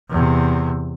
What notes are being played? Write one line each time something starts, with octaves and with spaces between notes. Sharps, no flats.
E2 C3